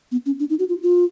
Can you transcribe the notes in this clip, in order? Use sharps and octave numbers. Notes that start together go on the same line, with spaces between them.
B3
C#4
D4
D#4
F#4
F4
F4